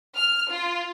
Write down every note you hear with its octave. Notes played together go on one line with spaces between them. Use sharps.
F6
F4